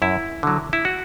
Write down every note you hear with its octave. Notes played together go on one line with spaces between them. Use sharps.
F#2 E4
D3 F#3
E4
F#4